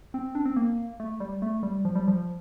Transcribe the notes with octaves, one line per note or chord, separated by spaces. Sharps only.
C4
D4
C4
A#3
A3
G3
A3
G3
F3
G3
F3